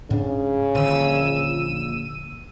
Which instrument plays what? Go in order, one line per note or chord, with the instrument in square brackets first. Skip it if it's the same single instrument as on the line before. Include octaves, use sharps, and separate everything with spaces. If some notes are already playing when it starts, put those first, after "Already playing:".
[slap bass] G#2 D4 [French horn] C#3
[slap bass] D#1 D3 D#3 [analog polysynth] A#1 E6 D#7